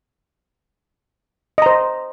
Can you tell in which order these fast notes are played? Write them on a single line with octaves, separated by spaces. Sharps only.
D#5 A#5 C5